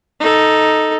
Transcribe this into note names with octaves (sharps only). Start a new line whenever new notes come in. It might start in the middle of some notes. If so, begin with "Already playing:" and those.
D#4 A4